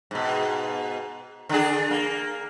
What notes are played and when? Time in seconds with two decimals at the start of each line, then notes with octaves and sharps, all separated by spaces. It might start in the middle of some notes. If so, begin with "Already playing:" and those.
0.11 G#2 B2
1.49 D3 D4 G#4
1.91 A#3